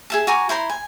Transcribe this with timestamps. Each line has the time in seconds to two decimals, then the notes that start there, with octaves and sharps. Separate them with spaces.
0.10 G#4 E5 A5
0.27 F#4 G#5 A#5 D6
0.49 E4 C5 A#5 C6
0.70 G#5